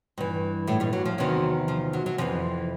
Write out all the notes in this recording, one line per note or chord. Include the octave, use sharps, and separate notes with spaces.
G2 E3
A2 A3
G2 G3
F#3
F3
E2 C3 D#3 F#3
F3
F#3
F#3
F2 C3 E3 F3